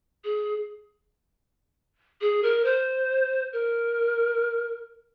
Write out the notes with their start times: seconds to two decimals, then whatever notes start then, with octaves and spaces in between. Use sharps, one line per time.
0.24 G#4
2.21 G#4
2.43 A#4
2.65 C5
3.53 A#4